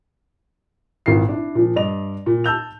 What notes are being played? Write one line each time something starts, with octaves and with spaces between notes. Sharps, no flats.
G#1 A#2 D#3 E3 C7
D4 E4
A#2 F3
G2 D5 D#5 F7
A#2
A5 E6 G6 F7